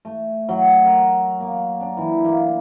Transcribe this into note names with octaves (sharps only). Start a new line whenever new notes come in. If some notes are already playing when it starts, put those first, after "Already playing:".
A3
F#3
A#4
A#3
D4
E3
A#3